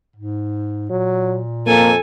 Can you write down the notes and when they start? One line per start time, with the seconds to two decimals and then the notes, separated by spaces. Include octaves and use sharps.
0.16 G#2
0.90 A#2 F#3
1.66 F2 A#3 A4 G#5